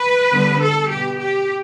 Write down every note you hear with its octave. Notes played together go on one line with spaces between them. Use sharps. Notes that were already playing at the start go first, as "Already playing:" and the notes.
Already playing: B4
D3 G3 B3
A4
B2 B3 G4
G4